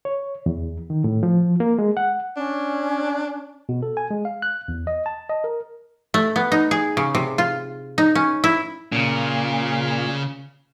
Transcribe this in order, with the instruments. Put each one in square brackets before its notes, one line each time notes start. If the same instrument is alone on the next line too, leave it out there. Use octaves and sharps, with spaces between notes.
[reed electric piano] C#5
E2
D#3
A2
F3
A#3
G#3
F#5
[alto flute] C#4 [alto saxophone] D4
[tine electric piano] B2
A4
G#5
G#3
F5
F#6
E2
D#5
A5
D#5
A#4
[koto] A3
B3
D#4
G#4
C#3
C3
F4
D#4
C#4
E4
[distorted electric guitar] A#2 [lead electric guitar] C#3 C#4